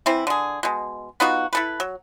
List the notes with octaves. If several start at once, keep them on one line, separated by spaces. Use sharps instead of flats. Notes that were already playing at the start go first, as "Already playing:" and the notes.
E3 C4 E4
D3 G#4
B2 G#3
B3 D#4 F4 F#4
E4 A4 B4
F#3